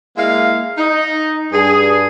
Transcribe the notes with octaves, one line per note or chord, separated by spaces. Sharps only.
G#3 A#3 E4 F5
D#4
G2 G#4